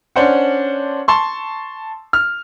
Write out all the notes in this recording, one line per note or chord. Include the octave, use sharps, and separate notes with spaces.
C#4 D4 C5 F#5
A5 C6 C#6
F6